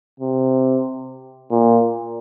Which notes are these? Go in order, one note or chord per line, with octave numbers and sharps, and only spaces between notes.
C3
A#2